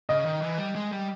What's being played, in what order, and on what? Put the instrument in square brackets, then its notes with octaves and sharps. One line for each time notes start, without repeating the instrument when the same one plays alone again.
[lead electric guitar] C#3 [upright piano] D#5
[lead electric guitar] D#3
E3
G3
G#3
G3